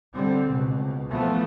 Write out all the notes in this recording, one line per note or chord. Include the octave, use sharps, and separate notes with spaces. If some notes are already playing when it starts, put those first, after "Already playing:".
D3 G3 C4
C#2 B2
E3 F3 A3 B3